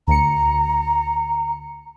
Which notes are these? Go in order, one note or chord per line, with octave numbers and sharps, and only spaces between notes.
D2 A#5 C#7